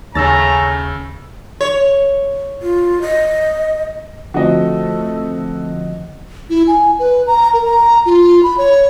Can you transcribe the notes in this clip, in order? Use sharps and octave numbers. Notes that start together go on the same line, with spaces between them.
D#2 C#3 A3 C#4 A#5 E6 A6
C#5
F4
D#5
D3 F3 A3 C4 F#4 D#5
E4
G#5
B4
A#5
A#4
A#5
F4
B5
C#5